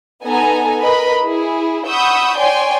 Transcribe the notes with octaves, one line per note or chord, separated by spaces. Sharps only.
B3 D#4 A4 G#5 A#5
A#4 B4 D#5 B5
E4 G#4
F#5 B5 C#6 D#6 E6 G6
C#5 D5 G5 G#5 C6